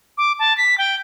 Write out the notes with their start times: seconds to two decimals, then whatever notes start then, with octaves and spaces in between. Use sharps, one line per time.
0.18 D6
0.39 A5
0.57 B6
0.78 G5